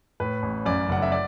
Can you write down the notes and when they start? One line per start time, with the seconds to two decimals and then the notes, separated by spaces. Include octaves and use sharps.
0.20 A2 B4
0.43 A1
0.66 F#2 D5
0.89 F#1 F#5
1.02 E5
1.12 D5